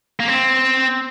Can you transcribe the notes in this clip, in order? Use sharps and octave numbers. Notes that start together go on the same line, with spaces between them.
A#3
C4